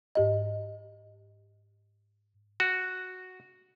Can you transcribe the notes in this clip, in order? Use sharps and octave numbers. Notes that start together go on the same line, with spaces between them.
G#2 G4 D#5
F#4